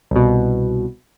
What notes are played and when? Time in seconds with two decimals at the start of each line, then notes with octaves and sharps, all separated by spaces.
0.11 C2 B2